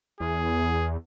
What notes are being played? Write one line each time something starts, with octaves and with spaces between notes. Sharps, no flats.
E2 G#4